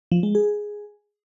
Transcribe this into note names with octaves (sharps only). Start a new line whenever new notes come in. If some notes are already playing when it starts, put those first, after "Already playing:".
F3
G#3
G#4